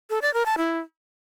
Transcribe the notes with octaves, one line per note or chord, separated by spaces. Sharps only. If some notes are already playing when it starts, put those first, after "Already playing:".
A4
D5
A#4
A5
E4